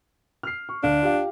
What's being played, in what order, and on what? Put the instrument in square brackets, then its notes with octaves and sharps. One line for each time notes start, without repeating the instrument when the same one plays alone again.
[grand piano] F6 C7
C#6
[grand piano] D2 D3 F5 [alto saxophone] D4
[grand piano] F4 G4 F5